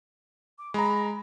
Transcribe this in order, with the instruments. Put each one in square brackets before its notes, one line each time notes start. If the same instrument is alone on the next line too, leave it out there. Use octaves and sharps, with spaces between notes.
[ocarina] D6
[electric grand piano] G#3 A#5 [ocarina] B5